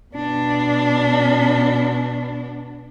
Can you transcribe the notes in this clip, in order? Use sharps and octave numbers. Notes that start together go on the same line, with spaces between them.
B2 D4